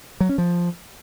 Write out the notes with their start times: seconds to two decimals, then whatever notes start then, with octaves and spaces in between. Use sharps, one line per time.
0.20 F#3
0.29 C#4
0.38 F3